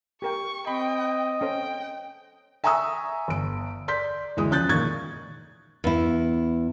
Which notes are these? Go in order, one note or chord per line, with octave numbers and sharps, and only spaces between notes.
G4 A#4 G5 C#6
C4 D#5 G5 B5
C#4 A4 C5 G5
E5 G#5 A#5 C#6 D#6 E6
G1 D7
D5 C6 G6 B6
D2 E3 G#3 D#6
C#3 F3 F#6 G6 A6
A#2 D#3 C#6 G#6 A6
E2 E4